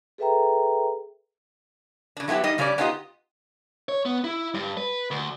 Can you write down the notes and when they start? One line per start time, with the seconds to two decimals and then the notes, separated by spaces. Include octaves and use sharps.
0.18 G#4 A4 B4 E5 G5 A#5
2.17 C#3 D4
2.28 F#3 A3 B3 E4 G4
2.44 G3 D#4 D#5
2.58 C#3 G3 C#4 B4 D5
2.78 B3 C#4 D#4 F4 G4 D#5
3.89 C#5
4.06 B3
4.24 E4
4.54 G2
4.77 B4
5.11 D2